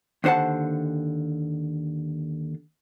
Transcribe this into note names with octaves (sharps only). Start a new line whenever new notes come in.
D#2 D3 C5 F#5 A5